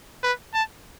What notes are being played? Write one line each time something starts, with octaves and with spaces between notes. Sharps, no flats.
B4
A5